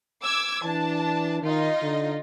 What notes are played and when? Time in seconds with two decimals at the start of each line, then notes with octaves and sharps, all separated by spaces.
0.23 D6 E6 G#6
0.64 E3 D4 A5
1.42 D#3 D#4 F4 D#5
1.82 D3